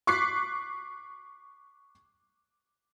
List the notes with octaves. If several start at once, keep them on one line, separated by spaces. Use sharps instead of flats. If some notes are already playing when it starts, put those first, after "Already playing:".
C#6 D6 F#6 B6 C7